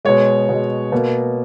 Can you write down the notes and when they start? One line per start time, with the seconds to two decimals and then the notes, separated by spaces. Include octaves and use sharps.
0.05 B2 G#3 C#5
0.49 B2 G#3
0.92 B2 A#3